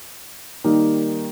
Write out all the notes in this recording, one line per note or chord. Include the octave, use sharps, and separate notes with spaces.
D#3 G3 A#3 D#4 G4